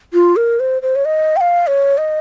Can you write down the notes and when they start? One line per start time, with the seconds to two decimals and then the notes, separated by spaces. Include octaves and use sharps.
0.13 F4
0.36 A#4
0.60 C5
0.82 C5
0.96 C#5
1.05 D#5
1.37 G5
1.41 F5
1.67 C#5
1.98 D#5